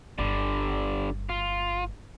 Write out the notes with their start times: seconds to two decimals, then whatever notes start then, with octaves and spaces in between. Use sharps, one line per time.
0.19 G1 D3 G3
1.29 F4